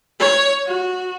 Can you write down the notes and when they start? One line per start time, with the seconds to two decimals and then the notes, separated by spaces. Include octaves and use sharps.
0.20 C#5
0.67 F#4